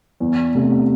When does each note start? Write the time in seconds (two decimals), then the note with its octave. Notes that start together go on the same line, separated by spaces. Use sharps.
0.20 E2
0.55 C3 A3